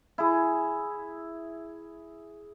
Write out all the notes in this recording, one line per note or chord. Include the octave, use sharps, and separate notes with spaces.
E4 G#4